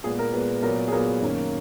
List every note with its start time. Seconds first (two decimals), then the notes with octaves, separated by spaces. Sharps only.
0.04 A#2 G#3 B3 G#4
0.19 A#4
0.33 A#2 G#3 B3 B4
0.62 A#2 F#3 B3 A#4
0.88 G#4
0.92 A#2 F#3 B3 A#4
1.21 F#2 D#3 A#3 C#4